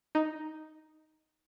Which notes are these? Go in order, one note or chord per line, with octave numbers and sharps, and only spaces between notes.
D#4